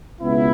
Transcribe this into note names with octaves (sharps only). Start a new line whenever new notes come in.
C#2 B2 B3 E4